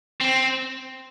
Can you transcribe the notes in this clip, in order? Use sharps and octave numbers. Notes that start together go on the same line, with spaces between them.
C4